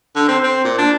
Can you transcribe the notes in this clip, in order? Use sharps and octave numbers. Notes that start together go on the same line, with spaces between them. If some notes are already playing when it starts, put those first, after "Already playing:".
D3
C4
C4
A#2
D4